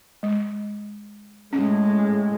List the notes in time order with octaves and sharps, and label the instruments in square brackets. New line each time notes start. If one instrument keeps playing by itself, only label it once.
[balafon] G#3
[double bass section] A2 G#3 [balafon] C#4